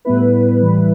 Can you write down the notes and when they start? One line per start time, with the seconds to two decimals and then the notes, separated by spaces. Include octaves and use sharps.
0.05 A2 G3 B3 E4 B4
0.60 A2 E3 G3 E4